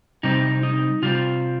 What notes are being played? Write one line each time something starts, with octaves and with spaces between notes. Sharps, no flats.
C3 G3 C4 D#4
D#4
C3 G3 C4 F4